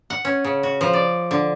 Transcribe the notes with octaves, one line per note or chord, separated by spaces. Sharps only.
F#5
C#4
C#3
F#4
F3
D5
D3